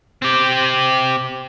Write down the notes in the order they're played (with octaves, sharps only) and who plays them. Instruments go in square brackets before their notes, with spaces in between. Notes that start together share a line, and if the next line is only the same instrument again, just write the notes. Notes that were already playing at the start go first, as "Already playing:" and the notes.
[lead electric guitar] C4 G4